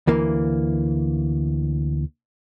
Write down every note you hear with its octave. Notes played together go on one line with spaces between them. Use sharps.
D2 E3 A#3